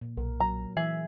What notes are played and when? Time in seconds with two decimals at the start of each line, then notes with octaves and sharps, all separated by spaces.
0.01 A#2
0.17 B1 A#4
0.40 F#3 A#5
0.77 E3 G#4 E5